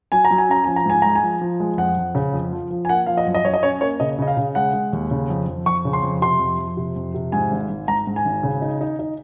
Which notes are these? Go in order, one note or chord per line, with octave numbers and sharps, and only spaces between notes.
F#3 G#5
A#5
F#3
G#5
C#4 A#5
F3 G#5
A#5
G#2 G#5
G#3 A#5
G#5
F3
F3
G#3
F2 F#5
F2
C#3
F2
F3
F3
G#5
A#3 F#5
F3 F5
D#5
F#2
D#5
F#2 C#5
D#5
C#4 C#5
A#3 C#5
C#3 D#5
C#3 D#5
F5
C#3
G#3 F#5
G#3
D#2
C#3
F2
F2
F2 C#6
C#3
C6
F2
C3 C6
F2
F2
C3
F2
C3
G#2 G#5
G#1
G#2
G#2 A#5
G#2
G#5
G#1
C#3
D#4
D#4
D#4